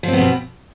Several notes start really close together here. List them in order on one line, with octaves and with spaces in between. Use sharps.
F3 C4 B3 B2